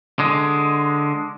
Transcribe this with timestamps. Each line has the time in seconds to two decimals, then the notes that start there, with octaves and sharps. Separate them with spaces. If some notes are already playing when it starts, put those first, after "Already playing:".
0.19 D3 G#3